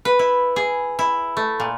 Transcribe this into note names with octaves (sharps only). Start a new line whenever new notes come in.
B4
E4
G#4
E4
A3
A#2